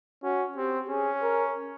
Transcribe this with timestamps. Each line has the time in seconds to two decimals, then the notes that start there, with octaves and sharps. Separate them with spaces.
0.24 C#4 F#4
0.56 C4 G4
0.89 C#4 G#4
1.22 A#4